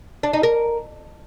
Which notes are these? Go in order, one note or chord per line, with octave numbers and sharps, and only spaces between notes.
D4
D#4
A#4